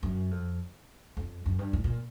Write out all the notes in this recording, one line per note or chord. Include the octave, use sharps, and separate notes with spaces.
F#2
F2
F2
F#2
G2
A2
A#2